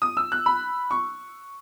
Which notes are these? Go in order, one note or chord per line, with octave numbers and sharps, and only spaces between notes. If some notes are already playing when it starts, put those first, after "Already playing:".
D#6
E6
F#6
B5
C#6